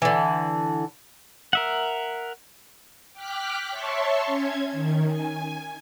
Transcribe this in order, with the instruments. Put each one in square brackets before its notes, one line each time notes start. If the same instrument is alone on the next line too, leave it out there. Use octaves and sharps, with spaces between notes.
[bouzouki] D3 E3
[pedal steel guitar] A#4 E5 F#5
[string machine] G5 D6 F6 F#6 B6
C#5 E5 A5 C6 C#6
C#4 G#6
D#3
G#5